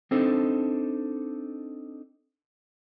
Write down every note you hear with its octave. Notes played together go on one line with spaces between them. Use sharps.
C4 D4 D#4 A4 C5